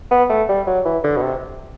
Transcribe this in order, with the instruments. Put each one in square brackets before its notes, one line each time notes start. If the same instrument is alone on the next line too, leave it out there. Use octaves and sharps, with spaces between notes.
[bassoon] B3
A3
G3
F#3
E3
D3
B2
C3